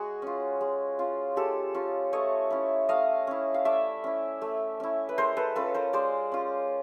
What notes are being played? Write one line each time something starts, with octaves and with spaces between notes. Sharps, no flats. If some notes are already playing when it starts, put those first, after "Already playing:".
Already playing: G#3 F#4 G#4
C#4 F4
G#3
C#4 F4
G#3 G4 A4
C#4 F4
A3 C#5 D#5
C#4 E4
A3 D#5 F5
C#4 E4
F5
A3 D5 E5
C#4 E4
A3
C#4 E4
B4
G#3 A#4 C5
A4 B4
C#4 F4 A4 B4
A#4 C5
G#3 C5 D5
C#4 F4